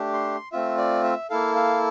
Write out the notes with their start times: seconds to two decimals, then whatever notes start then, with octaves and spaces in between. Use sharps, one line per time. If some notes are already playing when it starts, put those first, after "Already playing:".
Already playing: A3 D4 G4
0.14 C6
0.52 A3 C4 F4 E5
0.78 D5
1.04 E5
1.30 A#3 E4 A4 F5
1.56 F5